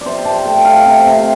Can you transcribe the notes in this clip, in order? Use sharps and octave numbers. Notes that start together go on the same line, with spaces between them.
C3 C5 D5
C3 A5
A3 G5
A3 F5
C3
C3